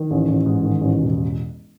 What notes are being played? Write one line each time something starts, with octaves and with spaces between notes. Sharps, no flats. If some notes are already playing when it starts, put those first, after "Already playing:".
Already playing: D#3
A1
A1
G#2
D#3
A1
E1